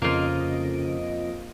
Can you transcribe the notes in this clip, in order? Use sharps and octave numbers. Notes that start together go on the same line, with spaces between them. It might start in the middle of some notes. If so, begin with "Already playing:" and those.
F2 C#3 F3 A#3 C#4 F4 D#5 D7